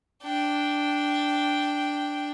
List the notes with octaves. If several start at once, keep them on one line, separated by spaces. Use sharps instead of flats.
D4 G5